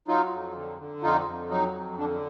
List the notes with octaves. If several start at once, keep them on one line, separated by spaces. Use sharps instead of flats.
F#3 D#4 F4
F2
D3
D3
F2 D#4 F4
F2
F#3 D#4
F2
D3 D4